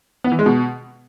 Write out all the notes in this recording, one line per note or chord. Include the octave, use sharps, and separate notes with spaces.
B3
E3
G#3
B2